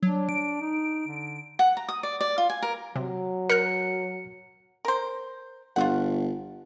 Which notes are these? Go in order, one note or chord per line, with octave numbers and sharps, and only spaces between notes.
F#3 D4
D7
D#4
D3
F#5
A#5
D#6
D5
D5
F4
G#5
A#4
C3 F#3
A#4 F6 F#6 C#7
A#4 C5
G1 F4 F#4 F#5